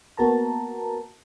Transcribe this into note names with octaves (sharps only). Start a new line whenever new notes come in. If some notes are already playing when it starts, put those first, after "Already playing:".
A#3 B3 F#4 A#4 A5 A#5